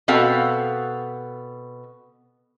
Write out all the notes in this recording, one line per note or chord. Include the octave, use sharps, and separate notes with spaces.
B2 C4 F#4 A4 F5